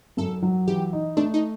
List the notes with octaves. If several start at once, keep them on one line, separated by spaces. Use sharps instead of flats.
F#2 A4
F#3
E3 G4
D#4
A3 D4
D#4